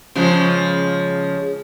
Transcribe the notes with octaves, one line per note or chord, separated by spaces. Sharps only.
C#3 F3 G#3